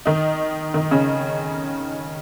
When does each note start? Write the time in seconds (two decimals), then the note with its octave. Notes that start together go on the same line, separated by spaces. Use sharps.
0.05 D#3 D#4
0.74 D#3 D#4
0.91 C#3 C#4